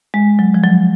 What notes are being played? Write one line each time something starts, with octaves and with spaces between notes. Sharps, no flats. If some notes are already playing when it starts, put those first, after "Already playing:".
G#3
F#3
F3
F#3